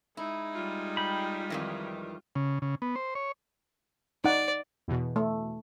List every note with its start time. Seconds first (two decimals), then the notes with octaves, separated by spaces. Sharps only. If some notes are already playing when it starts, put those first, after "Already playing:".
0.17 G#3 D#4 E4
0.53 G3 F4
0.97 G5 B5
1.50 F2 D#3 E3
2.36 C#3
2.62 C#3
2.82 B3
2.96 C5
3.15 C#5
4.25 D#4 D5 F#5
4.88 E2 B2
5.16 A3